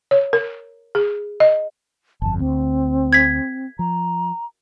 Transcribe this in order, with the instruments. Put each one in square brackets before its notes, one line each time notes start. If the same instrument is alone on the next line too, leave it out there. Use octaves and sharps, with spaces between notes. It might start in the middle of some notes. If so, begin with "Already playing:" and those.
[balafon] C#5
A#4
G#4
D#5
[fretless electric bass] G1 F2 [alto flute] A5
[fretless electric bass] D2 [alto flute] C4
[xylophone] G#6 B6
[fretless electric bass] F3 [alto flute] A#5